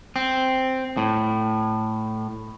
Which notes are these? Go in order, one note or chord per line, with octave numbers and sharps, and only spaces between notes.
C4
A2